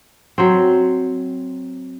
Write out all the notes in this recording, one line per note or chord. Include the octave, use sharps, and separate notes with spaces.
F#3 C4